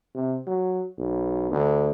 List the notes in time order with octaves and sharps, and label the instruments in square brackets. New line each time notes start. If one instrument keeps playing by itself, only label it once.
[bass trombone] C3
F#3
B1
D2